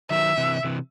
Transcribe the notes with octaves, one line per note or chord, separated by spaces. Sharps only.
D#3 F#3 E5
C3 E3
C3 E3